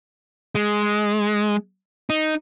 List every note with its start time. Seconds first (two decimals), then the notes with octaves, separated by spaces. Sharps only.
0.55 G#3
2.10 D#4